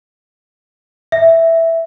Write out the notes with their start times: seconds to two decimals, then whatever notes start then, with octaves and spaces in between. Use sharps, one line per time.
1.12 E5